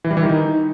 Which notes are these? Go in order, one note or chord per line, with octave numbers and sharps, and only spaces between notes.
E3
G3
E3
D#3
D#4